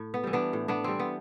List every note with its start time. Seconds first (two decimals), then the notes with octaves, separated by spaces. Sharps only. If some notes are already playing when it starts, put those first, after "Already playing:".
Already playing: A2
0.14 B3
0.24 E3 G3
0.33 B3 D4
0.53 A2
0.68 B3 D4
0.84 E3 G3 C4
1.00 B3